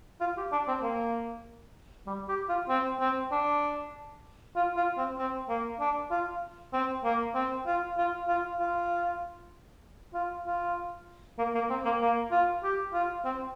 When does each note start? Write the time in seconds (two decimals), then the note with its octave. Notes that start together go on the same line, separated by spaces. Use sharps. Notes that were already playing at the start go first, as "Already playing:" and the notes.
0.20 F4
0.37 G4
0.52 D4
0.68 C4
0.82 A#3
2.07 G3
2.28 G4
2.49 F4
2.69 C4
3.00 C4
3.31 D4
4.56 F4
4.76 F4
4.98 C4
5.18 C4
5.48 A#3
5.80 D4
6.11 F4
6.73 C4
7.04 A#3
7.35 C4
7.66 F4
7.97 F4
8.28 F4
8.60 F4
10.14 F4
10.46 F4
11.38 A#3
11.55 A#3
11.70 C4
11.85 A#3
12.01 A#3
12.31 F4
12.63 G4
12.93 F4
13.25 C4